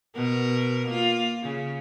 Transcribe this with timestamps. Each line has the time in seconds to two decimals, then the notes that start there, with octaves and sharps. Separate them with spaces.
0.15 B2 A#4
0.88 A#3 F4
1.43 C#3